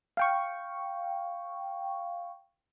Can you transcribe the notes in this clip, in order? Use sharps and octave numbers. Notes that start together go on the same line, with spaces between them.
F5 G5 C#6